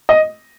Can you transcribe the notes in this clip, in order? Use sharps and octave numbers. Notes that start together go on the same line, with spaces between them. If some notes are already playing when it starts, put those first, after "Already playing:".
D#5